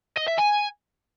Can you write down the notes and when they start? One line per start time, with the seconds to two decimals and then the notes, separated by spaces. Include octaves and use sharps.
0.17 D#5
0.28 E5
0.38 G#5